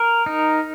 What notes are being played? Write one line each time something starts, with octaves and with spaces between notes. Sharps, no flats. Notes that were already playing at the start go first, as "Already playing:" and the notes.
Already playing: A#4
D#4